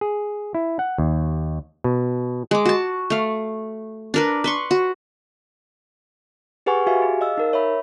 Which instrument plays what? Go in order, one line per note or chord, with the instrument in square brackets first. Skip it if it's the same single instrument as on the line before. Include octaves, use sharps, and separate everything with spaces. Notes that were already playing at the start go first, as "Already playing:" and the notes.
[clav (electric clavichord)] G#4
E4
F#5
D#2
B2
[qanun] G#3 D6
F#4 A5
A3 F5
D4 A#4 B4
B4 C6 C#6
F#4
[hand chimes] G4 G#4 B4 F#5 G#5 C#6
F#4 G4 E5 F5 G#5
G#4
D#5 F5 E6
D#4 A#4
C#5 E5 B5